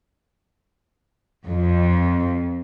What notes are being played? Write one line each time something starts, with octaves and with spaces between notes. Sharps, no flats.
F2